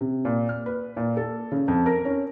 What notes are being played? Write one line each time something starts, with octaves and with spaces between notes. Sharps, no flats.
C3
A#2
F6
B4
A#2
A4
C#3
F2
A#4
C#4